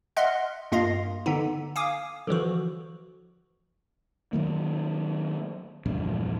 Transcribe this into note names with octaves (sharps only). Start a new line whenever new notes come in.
D#5 E5 F#5 C6 F6 F#6
G2 A#3 F4 D#5 F5
D3 B3 D#4
F5 G#5 D6 D#6
D3 E3 F3 F#4
D#3 F#3 A#3
A#1 E2 G2 D3